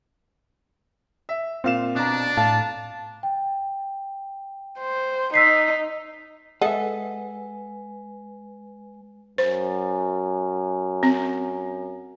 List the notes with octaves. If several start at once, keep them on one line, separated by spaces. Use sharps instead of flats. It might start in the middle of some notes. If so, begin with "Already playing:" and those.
E5
A#2 C4 F5 E7
B2 D4 A#5
A2 F5 A5
G5
C5
D#4 E6 B6 C7
G#3 G#4 A4 B4 D#5 E5 F#5 G#5
F#2 C5
C4